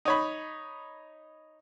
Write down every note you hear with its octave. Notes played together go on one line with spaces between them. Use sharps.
D#4 C#5 B5